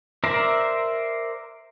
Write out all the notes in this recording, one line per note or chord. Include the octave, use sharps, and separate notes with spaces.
A#4 C5 D5 E5 A#5